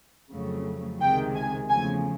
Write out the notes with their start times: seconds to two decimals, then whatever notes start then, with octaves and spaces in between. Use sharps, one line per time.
0.30 F2 C#3 F#3 A3
1.00 C#2 C3 D#3 G#3 G5
1.35 G#5
1.69 E2 C#3 F3 A3 G#5